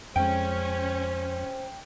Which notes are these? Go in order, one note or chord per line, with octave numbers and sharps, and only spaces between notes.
F2 G#3 C#4 C5 G5